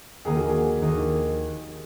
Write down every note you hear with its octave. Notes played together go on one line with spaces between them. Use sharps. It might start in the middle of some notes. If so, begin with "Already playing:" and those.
D#2 D#3 A#3 D#4 G#4
F#4
G#4
D#2 D#3 A#3 D#4